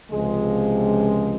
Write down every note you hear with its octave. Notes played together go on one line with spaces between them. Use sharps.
C#2 C3 F3 G#3